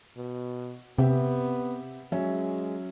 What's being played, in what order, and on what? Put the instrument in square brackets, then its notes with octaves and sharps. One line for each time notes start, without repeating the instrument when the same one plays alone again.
[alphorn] B2
[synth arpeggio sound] C3 [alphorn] B3 [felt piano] C4 G4 E5
[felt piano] F#3 C#4 E5 [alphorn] G#3